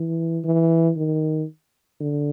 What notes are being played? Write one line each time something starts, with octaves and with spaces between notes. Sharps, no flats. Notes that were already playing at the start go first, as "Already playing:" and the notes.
Already playing: E3
E3
D#3
D3